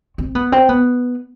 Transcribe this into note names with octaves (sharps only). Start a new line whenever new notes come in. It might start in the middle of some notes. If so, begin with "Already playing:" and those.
C4
B3
C4
B3